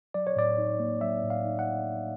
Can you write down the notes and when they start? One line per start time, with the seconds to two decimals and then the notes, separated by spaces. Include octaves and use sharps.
0.14 F#3 D5
0.27 C#5
0.36 A2 D5
0.58 D#4
0.80 A#3
1.01 F#3 E5
1.23 A2
1.30 F5
1.45 D#4
1.59 F#5